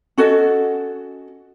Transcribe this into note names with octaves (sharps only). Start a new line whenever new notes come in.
C#4 F#4 A4 D#5